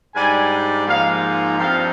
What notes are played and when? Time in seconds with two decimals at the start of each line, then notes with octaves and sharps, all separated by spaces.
0.15 G#2 G3 D4 G#5
0.87 G#2 F3 A#3 D#4 F5
1.58 G2 F3 C4 D#4 F5